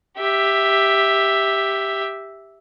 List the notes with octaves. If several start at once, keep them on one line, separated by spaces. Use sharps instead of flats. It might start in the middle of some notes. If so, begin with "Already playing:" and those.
G4 E5